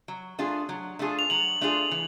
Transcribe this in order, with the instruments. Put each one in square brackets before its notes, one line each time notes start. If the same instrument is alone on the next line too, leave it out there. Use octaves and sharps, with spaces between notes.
[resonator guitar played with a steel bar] F#3
A3 D4 F4 G#4
F#3
A3 D4 F4 G#4
[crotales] F7
[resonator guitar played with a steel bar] F#3 [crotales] F#7
[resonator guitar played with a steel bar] A3 D4 F4 G#4
E3